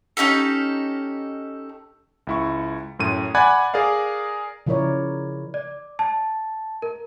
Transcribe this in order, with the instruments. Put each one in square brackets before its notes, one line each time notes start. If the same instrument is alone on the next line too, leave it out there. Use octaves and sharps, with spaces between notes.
[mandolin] C#4 D#4 G4 A4
[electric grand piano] C#2 E4 C#6
F#2 A2 D#7
D5 F#5 G#5 B5 F#6 G#6
G#4 A#4 D5 F5
[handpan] C#3 F3 E4 A#4 C#5 D5
[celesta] D5
A5
A#4